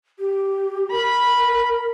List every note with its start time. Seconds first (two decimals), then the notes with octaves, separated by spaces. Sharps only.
0.19 G4
0.91 A#4 B5